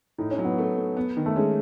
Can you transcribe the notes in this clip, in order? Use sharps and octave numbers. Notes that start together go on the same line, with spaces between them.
A2 D#4
C#4
F#3
B3
A3
A3
B3
D#3
A3
G#3 C#4